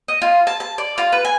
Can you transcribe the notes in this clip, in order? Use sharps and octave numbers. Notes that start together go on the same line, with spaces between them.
D#5
F4
A5
A5
D5
F4
B4
G#5